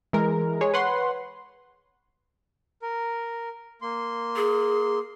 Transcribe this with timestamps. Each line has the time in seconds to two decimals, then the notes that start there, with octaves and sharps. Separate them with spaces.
0.13 E3 G#3 A#4
0.61 G#3 G#4 C#5
0.74 B4 C#5 F#5 C6
2.82 A#4
3.82 A#3 C6
4.36 G#4